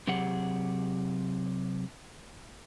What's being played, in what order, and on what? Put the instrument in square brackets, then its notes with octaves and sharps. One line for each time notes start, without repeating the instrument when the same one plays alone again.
[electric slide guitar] C3 F#3 G4 G#4 F#5